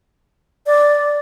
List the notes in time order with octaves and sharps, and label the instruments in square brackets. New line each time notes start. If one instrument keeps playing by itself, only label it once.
[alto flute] D5